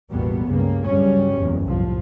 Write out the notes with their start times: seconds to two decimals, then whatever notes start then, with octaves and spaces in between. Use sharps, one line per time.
0.12 A1 E2 B2 G3 A#3 B3
0.46 C#2 G2 C#3 G3 A#3
0.86 G2 C#3 F#3 G3 C#4
1.38 F#1 E2 G2 A#2
1.67 C2 A2 F3